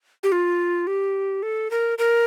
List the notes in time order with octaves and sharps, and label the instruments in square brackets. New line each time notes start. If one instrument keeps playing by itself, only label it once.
[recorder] G4
F4
G4
A4
A#4
A#4